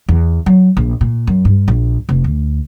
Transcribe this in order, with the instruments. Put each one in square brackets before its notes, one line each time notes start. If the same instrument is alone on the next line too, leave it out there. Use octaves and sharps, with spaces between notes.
[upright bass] E2
F#3
A#1
A#2
F#2
G2
A#1
F1
D2